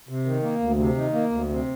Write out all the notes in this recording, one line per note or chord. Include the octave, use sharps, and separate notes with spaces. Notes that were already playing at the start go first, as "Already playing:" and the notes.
C3
D#3
A#3
D2
C3
D#3
A#3
D2
C3